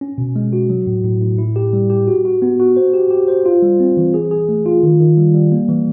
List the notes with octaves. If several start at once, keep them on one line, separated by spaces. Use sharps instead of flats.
C#4
B2
G#3
F#4
F#3
A2
A2
A2
E4
G4
G3
G4
F#4
F#4
B3
F#4
C5
G4
G4
C5
F4
G3
C4
E3
G#4
G#4
A3
F4
D#3
D#3
G3
G3
A#3
E3